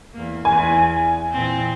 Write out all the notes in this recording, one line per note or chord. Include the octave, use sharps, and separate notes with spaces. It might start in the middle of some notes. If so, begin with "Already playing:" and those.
E2 A#3
E2 G#5
A#2 E3 C4